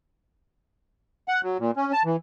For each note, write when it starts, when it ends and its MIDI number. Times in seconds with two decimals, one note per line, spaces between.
1.28 1.41 78
1.43 1.57 54
1.59 1.71 46
1.77 1.92 61
1.93 2.03 81
2.05 2.16 52